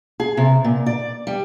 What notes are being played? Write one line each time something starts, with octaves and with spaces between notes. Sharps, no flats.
G#4
C3
A#2
D5
G3